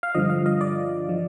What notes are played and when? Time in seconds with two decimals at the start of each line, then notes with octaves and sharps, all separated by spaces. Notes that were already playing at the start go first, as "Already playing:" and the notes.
0.03 F5
0.15 G2 D3 F3 D#5
0.30 F5
0.46 D#5
0.61 D5
1.09 F3